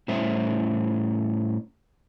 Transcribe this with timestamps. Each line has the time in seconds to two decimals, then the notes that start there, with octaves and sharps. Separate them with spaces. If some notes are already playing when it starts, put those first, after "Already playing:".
0.08 A2 G3 C#4 C5 E5